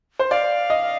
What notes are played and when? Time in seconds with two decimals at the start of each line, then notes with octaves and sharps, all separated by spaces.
0.19 C5
0.31 D5 F5
0.70 D#5